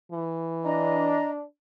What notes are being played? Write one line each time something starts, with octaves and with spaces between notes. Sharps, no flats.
E3
D4 D#5 A#5